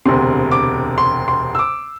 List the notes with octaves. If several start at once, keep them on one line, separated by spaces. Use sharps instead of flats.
E1 D2 C3 C6
D6
C6
C6
E6
D6